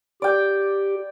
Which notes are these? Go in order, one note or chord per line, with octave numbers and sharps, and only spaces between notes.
G4 D5 G5